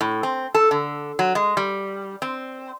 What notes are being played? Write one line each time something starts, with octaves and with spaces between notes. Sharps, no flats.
A2
C4
A4
D3
F#3
G#3
G3
C4